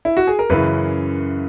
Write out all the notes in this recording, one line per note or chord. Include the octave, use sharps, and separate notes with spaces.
E4
F#4
G#4
A#4
F#2 C#3 E3 B4